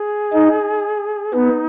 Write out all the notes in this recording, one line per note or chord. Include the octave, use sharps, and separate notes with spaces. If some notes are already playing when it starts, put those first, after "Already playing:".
Already playing: G#4
D#4
B3 D#4